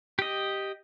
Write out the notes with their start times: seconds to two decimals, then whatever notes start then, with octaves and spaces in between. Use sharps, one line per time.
0.19 G4 D#5